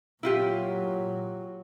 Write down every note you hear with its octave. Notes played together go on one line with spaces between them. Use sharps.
A#2 F#3 E4 F4 G4